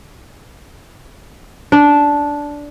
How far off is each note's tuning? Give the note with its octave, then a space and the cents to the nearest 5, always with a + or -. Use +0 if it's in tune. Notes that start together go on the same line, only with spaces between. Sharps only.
D4 -10